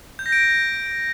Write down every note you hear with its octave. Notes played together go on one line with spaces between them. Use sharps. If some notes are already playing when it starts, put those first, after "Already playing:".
G6
A#6
D7